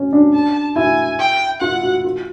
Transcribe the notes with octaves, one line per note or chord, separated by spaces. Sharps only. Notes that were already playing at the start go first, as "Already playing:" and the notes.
Already playing: C#4
D4
A5
E4 G#5
G5
F4 F#5
F#4
F4